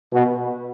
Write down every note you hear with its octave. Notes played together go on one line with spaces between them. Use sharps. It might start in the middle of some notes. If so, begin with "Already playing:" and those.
B2